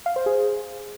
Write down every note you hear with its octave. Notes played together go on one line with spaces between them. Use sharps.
F5
C5
G#4